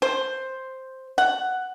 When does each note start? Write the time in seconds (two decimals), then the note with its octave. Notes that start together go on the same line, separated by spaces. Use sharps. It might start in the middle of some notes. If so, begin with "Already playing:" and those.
0.02 C5
1.18 F#5